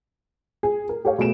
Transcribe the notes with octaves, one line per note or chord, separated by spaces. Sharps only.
G#4
A#4
G4 A4 C#5 F5
B2 A3 G#4 D7 E7